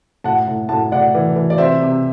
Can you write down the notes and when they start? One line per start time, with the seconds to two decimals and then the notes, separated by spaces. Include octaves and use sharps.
0.24 A2 F#5 A5
0.48 A2
0.69 A2 F#5 A5
0.92 A2 D5 F#5
1.15 E3
1.36 E3
1.50 D5
1.58 C3 C5 E5
1.81 C3